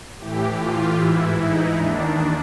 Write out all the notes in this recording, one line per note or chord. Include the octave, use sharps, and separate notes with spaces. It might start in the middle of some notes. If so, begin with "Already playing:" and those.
A2 E3 G4
F4
G#2 E3 E4
D#4
D#2 D#3 D4